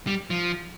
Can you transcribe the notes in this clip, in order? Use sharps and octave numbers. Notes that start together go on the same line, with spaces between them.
G3
F3